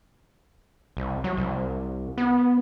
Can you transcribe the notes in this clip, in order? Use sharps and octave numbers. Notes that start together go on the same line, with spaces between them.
C2
F#3
C2
B3